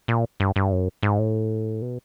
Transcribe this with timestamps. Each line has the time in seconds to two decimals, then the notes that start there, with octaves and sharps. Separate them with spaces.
0.08 A#2
0.40 G2
0.56 G2
0.72 F#2
1.03 G#2
1.19 A2
1.82 B2